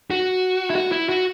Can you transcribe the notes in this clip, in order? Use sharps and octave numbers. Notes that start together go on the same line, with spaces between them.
F#4
E4
F#4
E4
F#4